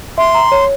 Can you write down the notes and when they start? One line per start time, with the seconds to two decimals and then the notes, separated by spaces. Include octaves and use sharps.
0.18 E5 C6
0.35 A#5
0.52 C#5